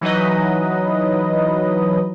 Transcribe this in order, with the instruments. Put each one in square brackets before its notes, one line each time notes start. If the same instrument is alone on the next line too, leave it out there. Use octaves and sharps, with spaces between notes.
[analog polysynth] E3 F#3 D#4 B4 D#5